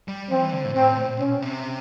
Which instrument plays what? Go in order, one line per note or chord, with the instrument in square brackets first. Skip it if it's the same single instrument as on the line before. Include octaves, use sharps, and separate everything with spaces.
[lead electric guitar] G3
[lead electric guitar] F3 [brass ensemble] C4
[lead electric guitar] E3
D3
A2
[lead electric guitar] A2 [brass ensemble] C4
[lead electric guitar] A#2
[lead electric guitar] B2 [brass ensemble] C#4
[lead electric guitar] C3